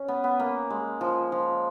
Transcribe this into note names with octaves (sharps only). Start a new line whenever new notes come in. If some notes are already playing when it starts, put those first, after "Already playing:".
Already playing: C#4
B3
B3
A#3
G#3
F3
F3